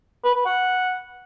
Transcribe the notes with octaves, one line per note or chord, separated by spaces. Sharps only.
B4
B4
F#5